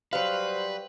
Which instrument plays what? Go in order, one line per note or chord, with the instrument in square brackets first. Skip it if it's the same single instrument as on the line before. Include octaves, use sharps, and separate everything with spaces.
[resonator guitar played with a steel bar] F#3 F5 [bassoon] G3 [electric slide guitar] B4 [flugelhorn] C5